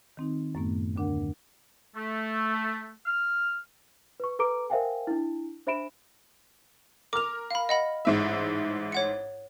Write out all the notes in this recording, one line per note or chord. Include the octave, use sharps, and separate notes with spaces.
D#3 C4 D#4
F#2 A2 A3 B3
D#2 D3 D4 A#4 F#5
A3
F6
B4 C#6
A4 B4 A#5 D6 D7
A#4 C5 E5 F5 G5 G#5
D4 E4
D4 C5 E5 B5 D7 E7
A#4 D6 F6 F7
F5 B5
D#5 F#5 B5
A1 G#2 E5
C#5 F#5 C#7